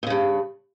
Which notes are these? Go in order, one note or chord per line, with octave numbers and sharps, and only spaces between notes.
G2 A#2 C#3